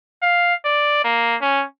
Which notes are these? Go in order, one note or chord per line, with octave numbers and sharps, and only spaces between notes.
F5
D5
A#3
C#4